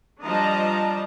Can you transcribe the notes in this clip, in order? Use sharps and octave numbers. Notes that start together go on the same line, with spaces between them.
F3 G3 D4 D#5 A5 A#5